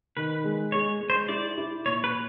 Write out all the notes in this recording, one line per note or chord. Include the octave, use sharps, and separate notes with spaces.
D#3 B4
G#3
G#3 C#5
G#3
C5
E4 D5
E4
A#2 C#5
B4